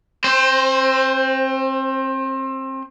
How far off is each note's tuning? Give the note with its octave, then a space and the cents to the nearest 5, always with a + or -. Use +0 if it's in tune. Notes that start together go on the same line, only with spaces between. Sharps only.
C4 +30 C5 +0